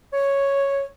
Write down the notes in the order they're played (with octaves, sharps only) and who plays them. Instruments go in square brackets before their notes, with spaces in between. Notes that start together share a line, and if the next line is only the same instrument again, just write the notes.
[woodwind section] C#5